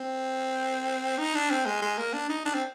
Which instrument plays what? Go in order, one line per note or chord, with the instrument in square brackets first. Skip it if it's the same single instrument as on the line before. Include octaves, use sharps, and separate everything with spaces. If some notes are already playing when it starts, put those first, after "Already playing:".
Already playing: [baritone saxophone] C4
D#4
D4
C4
G#3
G#3
A#3
D4
D#4
D4
C4